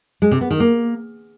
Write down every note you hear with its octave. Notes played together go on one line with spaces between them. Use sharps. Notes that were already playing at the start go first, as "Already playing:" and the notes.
G#3
C3
B3
D#3
A#3